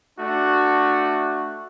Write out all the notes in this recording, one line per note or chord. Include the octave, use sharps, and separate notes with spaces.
A3 D4 F#4